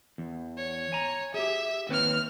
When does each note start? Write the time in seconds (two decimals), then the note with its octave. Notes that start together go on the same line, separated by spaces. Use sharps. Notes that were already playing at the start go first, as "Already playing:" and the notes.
0.18 E2
0.57 C#5
0.93 G#5 A#5
1.34 G4 G#4 E5
1.89 D#2 C4 B4 C#5 F6